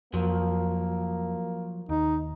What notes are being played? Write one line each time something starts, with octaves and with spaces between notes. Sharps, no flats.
F2 F3 F#3 A#3
D#2 D#4